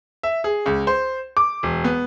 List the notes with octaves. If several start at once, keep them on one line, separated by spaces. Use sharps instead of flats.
E5
G#4
C#2
C5
D6
E1
B3